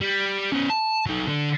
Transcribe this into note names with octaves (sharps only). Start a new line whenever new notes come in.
G3
B3 C#4
A5
F#3 D#4
D3